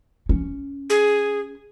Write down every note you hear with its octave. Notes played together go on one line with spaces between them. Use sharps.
C#4
G#4